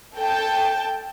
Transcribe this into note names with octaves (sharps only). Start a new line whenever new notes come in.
A4 G5 A5